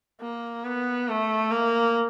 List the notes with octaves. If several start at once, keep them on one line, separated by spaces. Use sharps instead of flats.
A#3
B3
A3
A#3